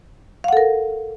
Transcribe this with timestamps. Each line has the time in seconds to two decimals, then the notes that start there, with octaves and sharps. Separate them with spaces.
0.44 F5
0.48 F#5
0.53 A4
0.57 A#4